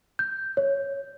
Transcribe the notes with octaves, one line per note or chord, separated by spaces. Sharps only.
G6
C#5